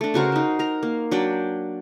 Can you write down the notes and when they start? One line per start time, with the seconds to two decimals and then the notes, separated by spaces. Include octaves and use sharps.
0.01 A3 D4
0.14 C#3 F#4 A#4 C5
0.32 D#4 C5
0.59 A#4 A#5
0.83 A#3
1.11 F#3 D4 D5 G5